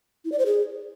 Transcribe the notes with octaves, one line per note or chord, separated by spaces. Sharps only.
E4
D5
C5
G#4